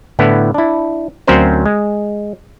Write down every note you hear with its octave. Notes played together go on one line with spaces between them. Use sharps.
A2 D3 B3 E4
D4 E4
D2 F#3 C4 C#4 A#4 C5
G#3